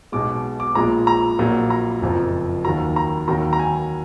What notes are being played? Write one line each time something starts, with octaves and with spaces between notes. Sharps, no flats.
B1 B2 G#3 D6
D6
A#1 A#2 F3 G#3 A#5
A#5
A#1 A#2 F#3
A#5
F#1 F2 F3
D#2 D#3 F#3 A#5
A#5
D#2 D#3 F#3 A#5
A#5
G#5